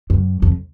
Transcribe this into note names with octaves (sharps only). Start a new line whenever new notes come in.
F#2
F2